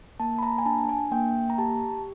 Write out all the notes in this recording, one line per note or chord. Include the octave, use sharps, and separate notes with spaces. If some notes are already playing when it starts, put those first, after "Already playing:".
A#3 A5
B5
A#5
G#5
D4 A5
G#5
A#3 G5
A#5
G4 A5